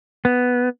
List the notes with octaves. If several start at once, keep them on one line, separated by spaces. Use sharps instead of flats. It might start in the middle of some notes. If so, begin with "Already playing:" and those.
B3